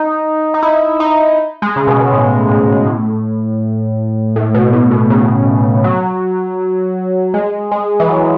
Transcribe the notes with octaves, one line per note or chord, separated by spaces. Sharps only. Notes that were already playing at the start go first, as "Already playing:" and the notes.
Already playing: D#4
D#4
E4
D#4
G#3
C#3
B2
B2
A2
G#2
A2
A2
B2
A2
B2
C#3
F#3
G#3
G#3
E3
F#3